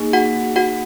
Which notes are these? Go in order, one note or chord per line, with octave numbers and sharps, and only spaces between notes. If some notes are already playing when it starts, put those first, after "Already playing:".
Already playing: A#3 D#4 G#4
F#4 F#5
F#4 F#5